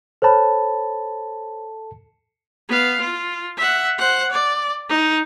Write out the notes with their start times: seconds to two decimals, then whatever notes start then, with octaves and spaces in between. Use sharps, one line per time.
0.22 A4 C5 C#5 A5 B5
2.69 B3 F5
3.01 F4
3.57 E5 F#5
3.98 C5 F#5
4.31 D5
4.89 D#4